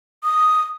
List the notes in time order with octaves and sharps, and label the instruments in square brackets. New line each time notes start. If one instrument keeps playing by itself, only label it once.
[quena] D#6